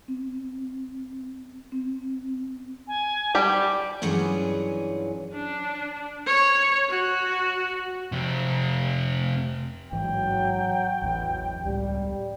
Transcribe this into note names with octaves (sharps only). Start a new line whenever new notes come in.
C4
C4
G#5
G3 G4 D6
G2 E3 F#3 C#4 F4 G#4
D4
C#5
F#4
F2 C3
A1 G#2 E3 F#3 G5
A1 E2 E3
C#2 A2 G3